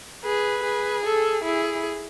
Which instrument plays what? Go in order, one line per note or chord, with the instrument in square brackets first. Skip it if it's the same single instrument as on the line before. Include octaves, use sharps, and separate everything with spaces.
[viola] G#4 [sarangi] B4
[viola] G#4
[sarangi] A4
[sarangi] E4 [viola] G#4